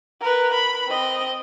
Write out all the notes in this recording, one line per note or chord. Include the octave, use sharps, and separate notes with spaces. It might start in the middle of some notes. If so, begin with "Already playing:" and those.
A#4 B4
B5
C4 D#5